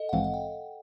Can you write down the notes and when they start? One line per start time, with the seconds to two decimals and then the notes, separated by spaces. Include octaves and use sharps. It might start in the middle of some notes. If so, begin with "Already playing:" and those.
Already playing: A4 D#5
0.09 F#5
0.13 A#1 G#2 E3 G#3 C4 F5
0.24 F#5
0.34 G5